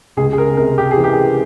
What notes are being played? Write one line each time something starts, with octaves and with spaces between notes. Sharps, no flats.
C#2 G#4
G#4
A#4
C3 A#4
G4
G#4
E3
G4